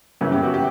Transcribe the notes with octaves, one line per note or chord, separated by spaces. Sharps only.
F#2 C#3 E3 C#4
G4
F#4
G4